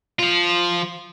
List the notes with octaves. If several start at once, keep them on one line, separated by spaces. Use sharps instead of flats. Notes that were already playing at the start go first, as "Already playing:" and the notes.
F3 F4